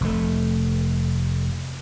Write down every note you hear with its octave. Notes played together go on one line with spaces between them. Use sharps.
F1 A3